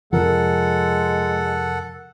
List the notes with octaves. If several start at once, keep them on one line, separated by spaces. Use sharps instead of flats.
F2 C3 F3 G#3 A4 A#4 F#5